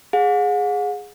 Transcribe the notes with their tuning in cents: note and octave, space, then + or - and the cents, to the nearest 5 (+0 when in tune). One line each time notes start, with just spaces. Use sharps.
G#4 +0 F#5 -40